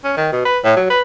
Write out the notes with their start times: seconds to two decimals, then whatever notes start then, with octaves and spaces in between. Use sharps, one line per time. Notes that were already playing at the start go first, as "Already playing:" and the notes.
0.04 C#4
0.17 D#3
0.32 B2
0.45 B4
0.64 A2
0.77 F#3
0.90 B4